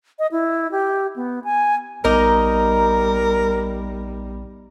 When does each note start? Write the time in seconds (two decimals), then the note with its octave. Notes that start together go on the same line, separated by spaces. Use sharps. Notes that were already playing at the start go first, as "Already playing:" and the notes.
0.19 D#5
0.32 E4
0.71 G4
1.16 B3
1.44 G#5
2.05 A#1 G3 B3 D#4 A#4 D6